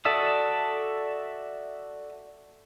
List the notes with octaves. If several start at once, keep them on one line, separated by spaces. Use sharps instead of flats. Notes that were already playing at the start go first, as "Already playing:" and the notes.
F#4 A4 D5 E5 D#6